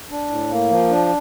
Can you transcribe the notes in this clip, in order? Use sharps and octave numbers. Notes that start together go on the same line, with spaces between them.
D4
A2
A#3
F3
D4